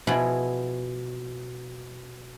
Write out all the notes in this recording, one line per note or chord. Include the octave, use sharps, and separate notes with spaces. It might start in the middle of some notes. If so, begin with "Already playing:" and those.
B2 F3 E4 G#4 B5